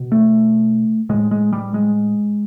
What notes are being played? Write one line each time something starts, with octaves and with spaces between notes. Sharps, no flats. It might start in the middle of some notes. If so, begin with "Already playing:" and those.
Already playing: B2
A3
A2 G#3
G#3
G3
G#3